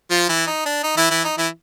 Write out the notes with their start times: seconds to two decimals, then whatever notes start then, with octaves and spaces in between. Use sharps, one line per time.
0.10 F3 F4
0.29 E3 E4
0.47 D#4
0.66 D4
0.83 D#4
0.97 E3 E4
1.10 E3 E4
1.25 D#4
1.38 E3 E4